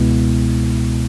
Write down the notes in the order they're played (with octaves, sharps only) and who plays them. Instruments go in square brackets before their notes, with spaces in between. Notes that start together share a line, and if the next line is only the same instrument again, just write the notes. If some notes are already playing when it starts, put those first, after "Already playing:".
Already playing: [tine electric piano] C#2 B2 G#3 B3 E4